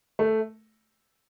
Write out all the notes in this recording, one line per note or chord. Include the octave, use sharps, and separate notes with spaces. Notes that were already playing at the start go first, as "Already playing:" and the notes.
A3